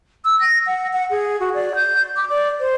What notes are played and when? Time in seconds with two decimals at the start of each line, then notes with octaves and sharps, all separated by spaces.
0.25 E6
0.40 A#6
0.67 F#5
0.93 F#5
1.10 G#4
1.40 F#4
1.54 D5
1.76 G6
2.16 D6
2.30 D5
2.60 C5